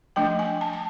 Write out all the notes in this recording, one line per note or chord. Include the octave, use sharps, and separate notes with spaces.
F3 A3 D4 G5
G#5
A5
A5